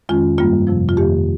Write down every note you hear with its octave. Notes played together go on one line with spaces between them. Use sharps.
F2 D#3 G#3 C#4 F4
G2 G3 A#3 F4
F2 C3 F3
F4
F2 D#3 A#3 G4